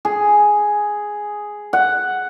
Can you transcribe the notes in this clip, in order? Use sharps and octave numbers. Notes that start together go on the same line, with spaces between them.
G#4
F#5